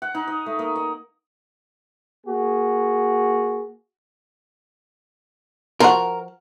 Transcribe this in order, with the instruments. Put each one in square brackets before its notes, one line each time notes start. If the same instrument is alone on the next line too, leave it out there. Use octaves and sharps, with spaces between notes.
[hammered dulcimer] F#5
D#4
D#5
A3
A#3
D#5
[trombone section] A#3 F#4 G#4
[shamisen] F3 F#4 [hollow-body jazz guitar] A#4